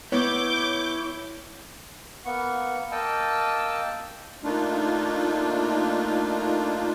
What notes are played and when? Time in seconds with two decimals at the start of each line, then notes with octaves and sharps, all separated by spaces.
0.12 B3 E4 C#5 D6 G6
2.25 A#3 B3 C#6
2.92 A#3 D#5 G5 A5 E6
4.44 A3 A#3 D4 D#4 F4